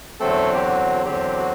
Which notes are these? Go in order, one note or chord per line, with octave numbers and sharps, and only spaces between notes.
E2 D3 F#3 A3 C4 A4
G4
F#4
E2 D3 F#3 C4 G4
F#4